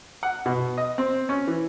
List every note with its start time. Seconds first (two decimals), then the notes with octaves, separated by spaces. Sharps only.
0.23 F#5
0.46 B2
0.77 D#5
0.98 C4
1.29 C#4
1.47 E3